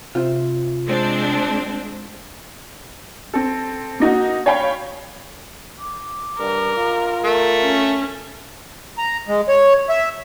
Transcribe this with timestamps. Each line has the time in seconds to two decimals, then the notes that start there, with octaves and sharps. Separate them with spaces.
0.15 C3 F4 C5 E5
0.87 G#3 C4 D4
3.34 C4 A4
4.00 A#3 D#4 F#4
4.46 C#5 F5 G5 B5
5.79 D6
6.39 G2 A#4
6.77 F4
7.24 A3 A#4
7.63 C#4
8.98 A#5
9.28 G#3
9.48 C#5
9.89 E5